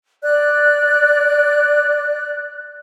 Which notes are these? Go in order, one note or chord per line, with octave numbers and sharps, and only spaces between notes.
D5 F#6